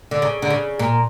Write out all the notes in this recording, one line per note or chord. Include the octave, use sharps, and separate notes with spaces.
D3
C#3
D3
C#3
A#2